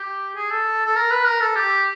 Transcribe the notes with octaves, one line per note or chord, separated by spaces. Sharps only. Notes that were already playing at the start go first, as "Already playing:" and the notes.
Already playing: G4
G#4
A4
A4
A#4
B4
A#4
A4
G4